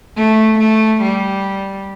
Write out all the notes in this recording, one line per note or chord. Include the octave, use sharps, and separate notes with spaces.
A3
A3
G3